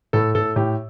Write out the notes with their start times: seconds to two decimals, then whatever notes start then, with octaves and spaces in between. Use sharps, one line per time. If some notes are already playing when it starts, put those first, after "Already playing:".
0.13 A2 A4
0.35 A2 A4
0.56 A2 G4